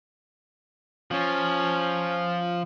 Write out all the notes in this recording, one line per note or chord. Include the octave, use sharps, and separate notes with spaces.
F3 C#4